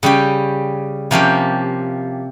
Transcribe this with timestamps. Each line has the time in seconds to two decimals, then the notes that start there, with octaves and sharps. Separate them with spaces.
0.03 C#3 G3 C#4 G4
1.11 C3 F3 A#3 C#4 G4